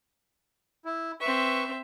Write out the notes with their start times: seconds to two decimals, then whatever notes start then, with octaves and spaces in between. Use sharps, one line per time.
0.85 E4
1.21 C4 B4 E5 C#6